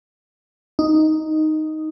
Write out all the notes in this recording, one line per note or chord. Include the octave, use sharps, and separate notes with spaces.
D#4